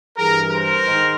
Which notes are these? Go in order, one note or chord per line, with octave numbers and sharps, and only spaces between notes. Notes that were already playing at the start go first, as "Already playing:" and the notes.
G2 E3 G#4 A#4
A#4 C5
G#2 D#3